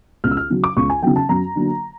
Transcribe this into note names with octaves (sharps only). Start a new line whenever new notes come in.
C#2 F6
E6
F6
C#3 F#3
D6
C#2 C#6
G#5
C#3 F#3 G5
A5
F#2 A#5
D3 F#3 A#3